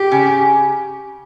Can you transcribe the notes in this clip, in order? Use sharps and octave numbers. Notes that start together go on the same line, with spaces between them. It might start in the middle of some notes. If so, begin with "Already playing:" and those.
Already playing: G4
C#3